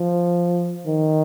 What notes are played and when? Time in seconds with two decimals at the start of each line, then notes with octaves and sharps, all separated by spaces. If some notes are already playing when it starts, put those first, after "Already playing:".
Already playing: F3
0.86 D#3